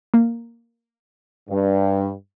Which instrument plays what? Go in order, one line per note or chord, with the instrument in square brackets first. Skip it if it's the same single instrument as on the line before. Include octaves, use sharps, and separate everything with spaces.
[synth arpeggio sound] A#3
[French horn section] G2